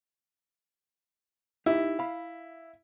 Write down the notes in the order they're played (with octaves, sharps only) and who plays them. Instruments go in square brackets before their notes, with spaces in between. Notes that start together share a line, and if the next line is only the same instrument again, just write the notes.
[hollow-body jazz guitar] D#4 G4 [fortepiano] E4
[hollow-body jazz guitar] F5 B5